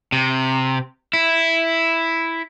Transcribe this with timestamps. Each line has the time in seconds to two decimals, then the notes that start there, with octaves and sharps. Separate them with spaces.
0.12 C3
1.13 E4